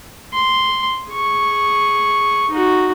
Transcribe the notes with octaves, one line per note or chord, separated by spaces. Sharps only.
C6
G#4 C#6
D#4 F#4